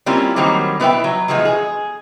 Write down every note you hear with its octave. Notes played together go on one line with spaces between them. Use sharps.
G3 A#3 C4 C#4 E4 F4
D#3 F#3 G3 A#3 C4
B2 B3 E4 B4 E5 G5
F#3
B2 E3 F3 G#3 B3
G#4